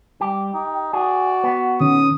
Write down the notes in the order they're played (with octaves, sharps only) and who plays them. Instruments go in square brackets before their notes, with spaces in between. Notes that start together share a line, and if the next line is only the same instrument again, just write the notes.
[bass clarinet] G3 [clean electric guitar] G4
[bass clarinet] D#4
[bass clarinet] F#4 [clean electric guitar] G#4 [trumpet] D5
[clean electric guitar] B3
[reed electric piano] D#3 C#4 [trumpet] D#6